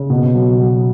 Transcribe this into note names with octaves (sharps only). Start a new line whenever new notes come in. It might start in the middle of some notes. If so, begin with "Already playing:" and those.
Already playing: C#3
B2
F#3
F#3